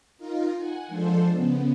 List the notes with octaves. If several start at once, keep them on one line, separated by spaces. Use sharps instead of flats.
D#4 F4 A#4
F#5 G#5
F3 G#3 D4 A4 C5
C#3 B3